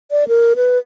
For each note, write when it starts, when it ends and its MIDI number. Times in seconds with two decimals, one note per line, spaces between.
0.11 0.28 74
0.28 0.54 70
0.56 0.78 71